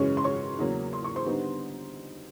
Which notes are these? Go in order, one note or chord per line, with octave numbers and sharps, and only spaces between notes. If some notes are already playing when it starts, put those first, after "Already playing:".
Already playing: F#2 C#3 E3 G#3 C#4 C#5 C#6
C6
C#5 C#6
E2 C#3 F#3 A#3 C#4
C6
C#6
C5 C6
D3 G3 B3 D#4